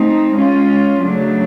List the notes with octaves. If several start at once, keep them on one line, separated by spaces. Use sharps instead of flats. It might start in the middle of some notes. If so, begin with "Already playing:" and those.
Already playing: A3 C4 D#4
G#3 C#4 F4
C#3 F#3 A3 D4